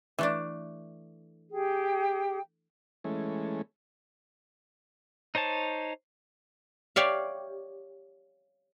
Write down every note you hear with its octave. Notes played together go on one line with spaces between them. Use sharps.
E3 A3 D4
G4 G#4 G5
E3 G#3 A3 C#4
D#4 C5 C#5 A5
G4 C#5 D5 E5 F5